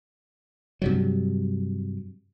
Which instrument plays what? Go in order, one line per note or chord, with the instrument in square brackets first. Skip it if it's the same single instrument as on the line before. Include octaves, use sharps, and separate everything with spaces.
[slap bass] G2 C3 F#3